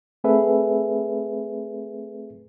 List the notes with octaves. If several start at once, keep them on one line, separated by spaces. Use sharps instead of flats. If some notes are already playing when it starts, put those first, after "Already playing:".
A3 C4 G#4 A4 B4 E5